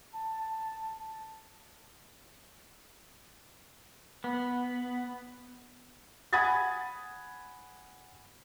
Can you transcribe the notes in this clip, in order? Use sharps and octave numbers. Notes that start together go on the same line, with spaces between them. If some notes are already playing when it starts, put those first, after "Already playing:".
A5
B3
F#5 G#5 B5 D#6 G#6 A6